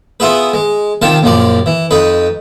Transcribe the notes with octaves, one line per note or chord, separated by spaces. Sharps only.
B3 E4 F4 G#4 B4
G#3
C3 D#3 F4 A5
A#1 F#2 F3 D5
E3
F2 D#4 B4